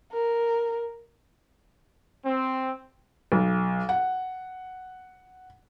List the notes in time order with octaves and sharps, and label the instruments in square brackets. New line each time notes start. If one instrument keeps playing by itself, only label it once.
[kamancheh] A#4
[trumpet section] C4
[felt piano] B1
F#5